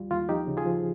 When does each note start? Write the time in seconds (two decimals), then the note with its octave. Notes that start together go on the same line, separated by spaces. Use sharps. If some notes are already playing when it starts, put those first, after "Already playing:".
Already playing: D#2 G3 F4
0.11 D#2 F4
0.29 F3 D#4 G4
0.47 C#3
0.57 F4 G#4
0.66 F3